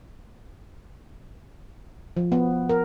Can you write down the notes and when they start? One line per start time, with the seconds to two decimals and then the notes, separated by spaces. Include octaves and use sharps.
2.17 F3
2.32 B3
2.69 A#4